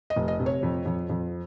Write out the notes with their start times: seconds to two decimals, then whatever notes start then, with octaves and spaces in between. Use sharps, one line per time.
0.10 D#5
0.16 F1
0.28 D#5
0.39 C3
0.46 C#5
0.63 F2
0.86 F2
1.10 F2